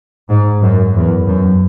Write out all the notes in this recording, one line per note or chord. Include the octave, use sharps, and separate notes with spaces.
G#2
F#2
E2
F#2